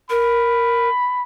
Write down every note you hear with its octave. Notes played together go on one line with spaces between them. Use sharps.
A#4 B5